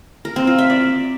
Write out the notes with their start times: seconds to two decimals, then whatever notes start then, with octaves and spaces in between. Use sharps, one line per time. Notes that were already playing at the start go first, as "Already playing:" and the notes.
0.25 A#4
0.36 C4
0.47 F4
0.58 E5
0.70 D5